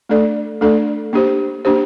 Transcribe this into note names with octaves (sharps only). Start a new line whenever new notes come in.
A3 D4 A4 D5
A3 D4 A4 D5
A#3 D4 G4 C5
A#3 D4 G4 C5